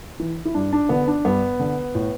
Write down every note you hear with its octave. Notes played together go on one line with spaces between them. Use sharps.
E3
E4
G2 D4
D4
D3 B3
D4
G2 B3
D3
A2